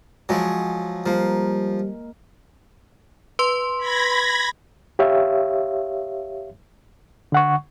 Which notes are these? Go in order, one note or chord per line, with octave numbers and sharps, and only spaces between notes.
F3 F#3 G#3
F3 G3 A#3
B4 C6
B5 G#6 A#6
G4 C#5 E5 F5
D3 F#5 C#6